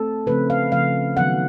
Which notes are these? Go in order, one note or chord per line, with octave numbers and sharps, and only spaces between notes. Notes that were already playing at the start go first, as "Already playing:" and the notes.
Already playing: A3 C4 A4
C#3 F3 A3 C4 B4
F5
C#3 F3 A3 C4 F5
D#3 F#3 B3 F#5